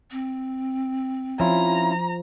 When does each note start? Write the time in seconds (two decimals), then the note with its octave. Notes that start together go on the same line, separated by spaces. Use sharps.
0.11 C4
1.40 F3 C#4 E4 F4 A#5